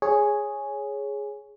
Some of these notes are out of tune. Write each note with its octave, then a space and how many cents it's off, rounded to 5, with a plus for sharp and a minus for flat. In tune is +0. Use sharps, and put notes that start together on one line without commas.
G#4 +0 C#5 +0